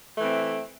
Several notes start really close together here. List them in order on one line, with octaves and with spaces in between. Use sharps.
A3 E3 C4